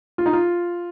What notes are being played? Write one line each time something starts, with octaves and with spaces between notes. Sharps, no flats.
F4
D#4
F4